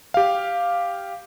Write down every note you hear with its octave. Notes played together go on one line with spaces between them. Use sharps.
G4 F5